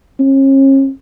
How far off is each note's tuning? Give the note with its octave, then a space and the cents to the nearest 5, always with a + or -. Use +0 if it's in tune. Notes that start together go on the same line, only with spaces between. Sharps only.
C#4 -40